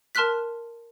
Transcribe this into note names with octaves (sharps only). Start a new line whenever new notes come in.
A#4 A5 C6 F6 F#6 B6